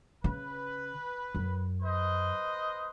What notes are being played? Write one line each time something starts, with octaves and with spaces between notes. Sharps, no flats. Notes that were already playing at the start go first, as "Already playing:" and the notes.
C#3 B4
F#2
B4 C5 D#5